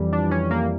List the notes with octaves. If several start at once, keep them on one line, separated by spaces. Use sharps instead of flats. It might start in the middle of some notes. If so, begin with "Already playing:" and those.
Already playing: F2 E3 G3
D4
C#4
A#3